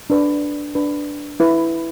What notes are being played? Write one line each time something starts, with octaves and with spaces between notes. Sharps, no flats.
D4 B4
D4 B4
E4 B4